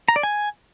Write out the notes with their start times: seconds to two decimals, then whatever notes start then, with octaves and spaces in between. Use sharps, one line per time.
0.08 A#5
0.16 D5
0.23 G#5